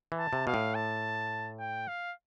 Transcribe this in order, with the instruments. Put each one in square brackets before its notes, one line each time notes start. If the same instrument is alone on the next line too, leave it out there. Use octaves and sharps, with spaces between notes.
[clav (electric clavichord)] E3
[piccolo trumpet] A5
[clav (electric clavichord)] C3
[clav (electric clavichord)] B2 [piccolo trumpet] F5
[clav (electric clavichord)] A2
[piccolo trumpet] A5
G5
F5